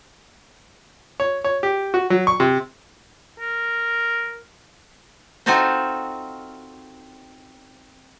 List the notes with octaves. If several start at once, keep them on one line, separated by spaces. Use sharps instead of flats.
C#5
C#5
G4
F#4
F#3
C#6
C3
A#4
C4 D#4 F4 F#4 A4 C5